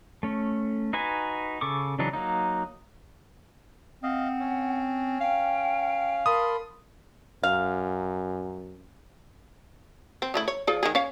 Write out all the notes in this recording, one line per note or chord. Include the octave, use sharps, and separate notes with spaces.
A3 C#4
D#4 F#4 B4 G#5
C#3 A4 C#6 D6
C#3 E3 F#3 D4 D#4
F#3 A#3 D#4
C4 D#5 F5 F#5
C#4
F5 G5
A#4 A5 B5 C6 D#6
F#2 F5
C4
C#3 A3 E4
C#5
F3 G#4 D5
D#3 G#3 G#4
C#4 C#5 F5